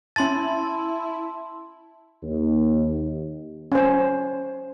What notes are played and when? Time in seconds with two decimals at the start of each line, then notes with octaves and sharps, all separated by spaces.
0.16 C#4 E4 A5 C6 A6
2.23 D#2
3.72 C#4 C5